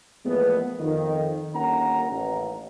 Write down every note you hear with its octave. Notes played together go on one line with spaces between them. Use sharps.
E2 A2 F3 G#3 A#3 B3
F2 D#3
G1 D#3 A#3 C#4 F#5 A#5
A1